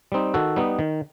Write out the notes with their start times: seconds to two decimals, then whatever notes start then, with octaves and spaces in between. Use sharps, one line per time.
0.12 G3 C4 D#4
0.34 D#3 F#4 A4
0.56 G3 B3 D#4
0.79 D#3